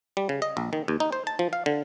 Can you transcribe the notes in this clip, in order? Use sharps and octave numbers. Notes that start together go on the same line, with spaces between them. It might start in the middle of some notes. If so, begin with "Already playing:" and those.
G3
C#3
D#5
A#1
D#3
D#2
D#4
C5
A5
F3
F5
D3